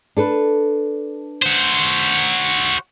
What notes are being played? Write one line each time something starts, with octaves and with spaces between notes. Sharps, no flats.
D4 A4 B4
F#4 C5